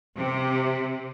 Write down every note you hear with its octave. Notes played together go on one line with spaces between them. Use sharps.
C3